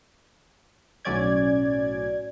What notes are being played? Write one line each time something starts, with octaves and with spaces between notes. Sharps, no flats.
B1 A2 F#3 C#4 D5 G#6